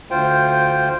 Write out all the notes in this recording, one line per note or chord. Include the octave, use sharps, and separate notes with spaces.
D2 F4 C5 G5